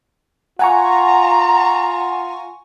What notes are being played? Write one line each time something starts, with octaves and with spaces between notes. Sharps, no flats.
F4 F#5 G#5 A#5 C#6